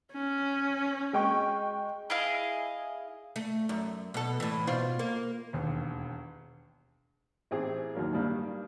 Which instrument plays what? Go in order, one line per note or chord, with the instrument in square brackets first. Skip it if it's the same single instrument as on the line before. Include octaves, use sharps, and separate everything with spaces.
[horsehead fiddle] C#4
[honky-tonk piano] G#3 G5 C#6
[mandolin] E4 G#4 D#5 F5
[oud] A3
F#2
B2 A4
A2 E3
B2 F4 C5
A#3
[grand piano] E1 D#2
[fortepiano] A1 C4 G4 G#4
D#2 F#3 A#3
G2 D#3 G3 A#3 D4